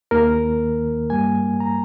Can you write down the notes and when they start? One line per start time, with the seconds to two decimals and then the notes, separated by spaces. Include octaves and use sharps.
0.11 D#2 D#3 A#3 A#4
1.10 G2 G3 A#3 G#5
1.60 A#5